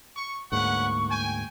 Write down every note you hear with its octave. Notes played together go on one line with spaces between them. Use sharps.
C#6
D2 G#2 A#3 C#4 B4 F#5 C#6
G5 G#5